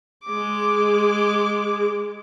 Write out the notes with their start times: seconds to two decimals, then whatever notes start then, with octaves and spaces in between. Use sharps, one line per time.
0.25 G#3 D6